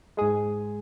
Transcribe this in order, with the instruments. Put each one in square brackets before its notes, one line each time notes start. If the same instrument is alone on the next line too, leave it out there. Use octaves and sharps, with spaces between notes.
[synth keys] G#2 G#3 G#4